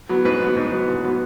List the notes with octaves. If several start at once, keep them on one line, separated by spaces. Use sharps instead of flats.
F#3 B3
G#2 B4
F#3 B3
G#2
F#3 B3
G#2
F#3 B3